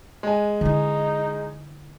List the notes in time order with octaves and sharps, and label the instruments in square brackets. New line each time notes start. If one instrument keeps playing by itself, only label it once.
[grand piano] G#3 G#5
[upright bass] D3 E4 [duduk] D#4